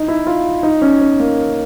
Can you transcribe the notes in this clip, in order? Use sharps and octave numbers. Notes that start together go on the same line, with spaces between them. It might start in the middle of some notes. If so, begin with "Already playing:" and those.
Already playing: D#4
E4
F4
D#4
C#4
C#4
A#3